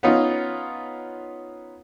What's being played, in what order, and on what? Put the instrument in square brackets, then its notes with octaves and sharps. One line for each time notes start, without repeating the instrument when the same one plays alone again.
[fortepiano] B3 C#4 D#4 F4